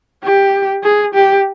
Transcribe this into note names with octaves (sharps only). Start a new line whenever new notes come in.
G4
G#4
G4